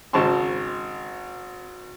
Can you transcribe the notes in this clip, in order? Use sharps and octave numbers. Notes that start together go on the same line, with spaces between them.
G#1 C#3 C5 A5 C6 C#6